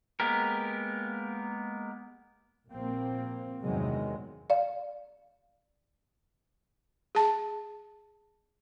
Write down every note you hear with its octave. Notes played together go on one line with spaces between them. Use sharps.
G#3 A#3 B3 G4 A#4
A#1 A#3 C4
E2 G2 C3 D#3 F#3 G#3
D5 F5
G#4 A5